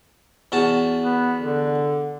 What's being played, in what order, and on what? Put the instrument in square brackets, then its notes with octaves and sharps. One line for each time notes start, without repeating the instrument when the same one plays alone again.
[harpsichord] E2 F#4 A5
[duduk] B3
D3